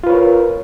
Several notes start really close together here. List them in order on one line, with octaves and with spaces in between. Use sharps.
F4 B4 C#5 A#4